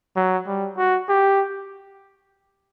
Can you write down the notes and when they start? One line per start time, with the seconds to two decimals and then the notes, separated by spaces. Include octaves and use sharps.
0.16 F#3
0.46 G3
0.77 F#4
1.09 G4